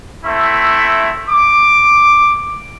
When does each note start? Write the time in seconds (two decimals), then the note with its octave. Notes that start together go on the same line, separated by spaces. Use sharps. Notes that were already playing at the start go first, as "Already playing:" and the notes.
0.25 A3 C4 E4 E5
1.29 D6